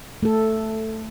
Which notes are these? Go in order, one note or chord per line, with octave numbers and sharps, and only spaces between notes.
A3 A4